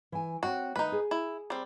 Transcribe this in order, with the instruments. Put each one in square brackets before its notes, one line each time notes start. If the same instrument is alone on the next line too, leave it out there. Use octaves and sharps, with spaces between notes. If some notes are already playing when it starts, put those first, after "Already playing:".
[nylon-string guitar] E3 G#5
[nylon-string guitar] C4 C#5 G5 [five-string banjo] F#4
[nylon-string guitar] D#3 A3 [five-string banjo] D#4 B4
[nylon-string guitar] G#4
[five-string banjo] E4
G3 C4